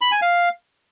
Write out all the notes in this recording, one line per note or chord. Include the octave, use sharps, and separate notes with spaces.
B5
G#5
F5